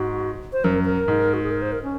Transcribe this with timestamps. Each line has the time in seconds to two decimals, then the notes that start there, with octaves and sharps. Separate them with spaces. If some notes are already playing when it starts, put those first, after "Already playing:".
Already playing: G#2 F#4
0.53 C5
0.64 F#2 A#4
0.85 A#4
1.08 G#2
1.34 F#4
1.43 G#4
1.51 A#4
1.62 C5
1.72 A#4
1.83 C#4